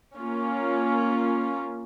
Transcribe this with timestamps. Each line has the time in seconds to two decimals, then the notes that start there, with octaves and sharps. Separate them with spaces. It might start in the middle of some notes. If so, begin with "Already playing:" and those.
0.18 A#3 C#4 F4